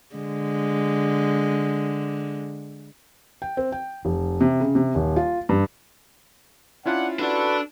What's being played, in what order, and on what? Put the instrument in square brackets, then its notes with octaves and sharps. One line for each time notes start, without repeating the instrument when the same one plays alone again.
[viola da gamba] D3 G#3
[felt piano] G5
C4
G5
F1
C3
C#3
C3
D#1
F4
G2
[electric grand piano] C#4 E4 F4 [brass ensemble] D4 F#5
[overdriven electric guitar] D4 D5 [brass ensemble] F#4 A4 B4